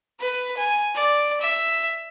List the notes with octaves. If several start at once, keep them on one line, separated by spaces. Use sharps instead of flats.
B4
G#5
D5
E5